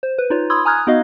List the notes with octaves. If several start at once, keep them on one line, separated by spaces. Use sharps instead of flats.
C5
B4
D#4 F4 C#5
B5 C6 D#6 E6 G#6
G#5 A#5 D#6 F6 F#6 G#6
B3 D#4 F#4 D#5 F5